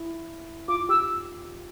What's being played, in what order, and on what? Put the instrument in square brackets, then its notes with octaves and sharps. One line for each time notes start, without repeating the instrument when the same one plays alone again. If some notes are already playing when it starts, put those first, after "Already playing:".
Already playing: [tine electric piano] E4
[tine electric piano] F4 [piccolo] D6
[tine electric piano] G4 [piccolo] E6